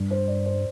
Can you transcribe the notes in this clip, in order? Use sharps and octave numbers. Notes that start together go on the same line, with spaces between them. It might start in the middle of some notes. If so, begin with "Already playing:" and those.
Already playing: G2
C5
D5
C5